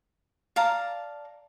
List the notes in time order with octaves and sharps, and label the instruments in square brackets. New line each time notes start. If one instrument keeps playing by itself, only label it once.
[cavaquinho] D5 F5 A5 A#5